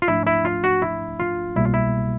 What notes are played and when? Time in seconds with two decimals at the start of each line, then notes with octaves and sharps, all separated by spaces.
0.02 F4
0.08 G#2 F3 A3 D4 E4
0.27 E4
0.45 F4
0.64 F#4
0.82 E4
1.20 F4
1.56 C2 B2 G3 A#3 E4
1.65 F4
1.74 E4